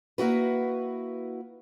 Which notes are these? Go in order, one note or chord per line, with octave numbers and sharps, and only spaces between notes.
A#3 E4 F#4 B4